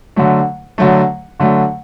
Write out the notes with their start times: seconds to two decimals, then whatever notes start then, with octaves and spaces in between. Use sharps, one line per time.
0.16 D3 F#3 A3
0.78 D3 F#3 A3
1.40 D3 F#3 A3